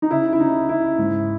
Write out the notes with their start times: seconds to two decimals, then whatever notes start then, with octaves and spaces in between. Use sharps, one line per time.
0.02 D#4
0.11 C#3 E4
0.33 E4
0.40 C#3 D#4
0.69 C#3 E4
0.98 G#2